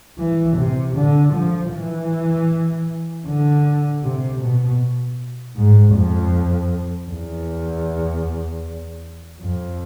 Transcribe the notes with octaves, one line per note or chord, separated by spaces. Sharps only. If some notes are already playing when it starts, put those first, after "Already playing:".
E3
C3
D3
F3
E3
D3
C3
B2
G#2
F2
E2
F2